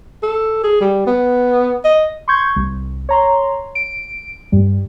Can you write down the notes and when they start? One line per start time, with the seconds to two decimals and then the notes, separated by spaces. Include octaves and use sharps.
0.23 A4
0.64 G#4
0.81 G3
1.07 B3
1.84 D#5
2.28 C6 C#6 G6 G#6
2.56 C2
3.09 C#5 A#5 C6
3.75 D7
4.52 G2 G3